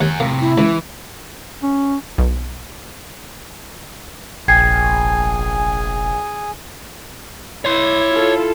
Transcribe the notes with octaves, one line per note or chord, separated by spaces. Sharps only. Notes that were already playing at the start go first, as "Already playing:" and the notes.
D#2 F#5 G#5
A2 C3 A#3
E4
C#2 E3
C#4
B1
F1 A#1 G#4 G5 G#5 G#6 C7
E4 C#5 C6
F4 A4